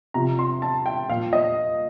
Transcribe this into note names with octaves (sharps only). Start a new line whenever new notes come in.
C3 F3 A#5
C6
A5
G5
A#2 F3 F5
D#5